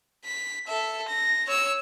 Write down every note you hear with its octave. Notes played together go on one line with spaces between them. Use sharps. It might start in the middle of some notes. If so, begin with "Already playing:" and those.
B6
A4 E5
A#6
C#5 E6